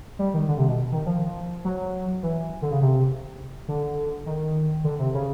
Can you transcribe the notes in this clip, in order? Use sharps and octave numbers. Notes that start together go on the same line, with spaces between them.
G3
D#3
D3
C3
B2
D#3
F3
F#3
E3
D3
C#3
C3
D3
D#3
D3
C3
C#3